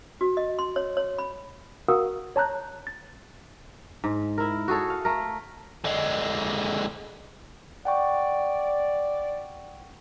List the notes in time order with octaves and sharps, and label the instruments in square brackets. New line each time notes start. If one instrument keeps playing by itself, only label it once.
[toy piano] F#4
D#5
C6
C#5
C#5
B5
[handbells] F#4 A#4 F5 F#5 D#6 E6
C#5 A5 A#5 F#6 G6
A6
[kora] G#2
E4 A#4
F#4 G#4 A4 C#5
F5
A3 A#4
[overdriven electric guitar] D3 G#3
[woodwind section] D5 [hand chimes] F#5 G5 C#6